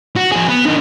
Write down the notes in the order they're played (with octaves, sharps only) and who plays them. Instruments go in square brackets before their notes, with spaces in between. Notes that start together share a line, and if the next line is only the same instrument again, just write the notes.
[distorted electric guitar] F#4
F3 G#4
B3
D3 D#4